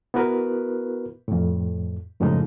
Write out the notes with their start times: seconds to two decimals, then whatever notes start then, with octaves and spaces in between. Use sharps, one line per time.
0.14 B3 E4 F#4 A#4 B4
1.28 F2 A2
2.20 F#2 A2 C#3 F3 G#3 D#4